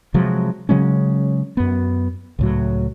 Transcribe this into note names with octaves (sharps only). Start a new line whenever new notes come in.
C3 F3 F#3 G#3
C#3 F#3 G#3 C#4
F#2 B3
C#2 A2 F#3